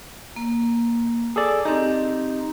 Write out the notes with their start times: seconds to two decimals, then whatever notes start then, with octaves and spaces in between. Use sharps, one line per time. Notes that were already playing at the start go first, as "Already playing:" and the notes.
0.36 A#3
1.36 G#4 A4 D5
1.65 C4 D#4 G4